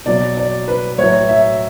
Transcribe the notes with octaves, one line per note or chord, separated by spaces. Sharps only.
B2 F#3 D5
D5
B4
A2 F#3 C#5
E5